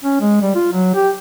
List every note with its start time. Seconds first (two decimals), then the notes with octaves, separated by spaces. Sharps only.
0.04 C#4
0.21 G#3
0.42 G3
0.55 F4
0.73 F#3
0.95 G4